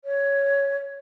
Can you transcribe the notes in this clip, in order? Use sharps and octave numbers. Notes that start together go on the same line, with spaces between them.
C#5